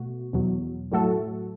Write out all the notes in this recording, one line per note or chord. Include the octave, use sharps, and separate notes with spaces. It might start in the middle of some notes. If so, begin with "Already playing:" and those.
Already playing: B2 A3 F#4
E2 B2 F#3
A2 F#3 A3 F#4 A4